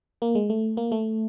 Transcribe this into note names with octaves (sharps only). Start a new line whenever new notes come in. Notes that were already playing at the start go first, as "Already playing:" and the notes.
A#3
G#3
A3
A#3
A3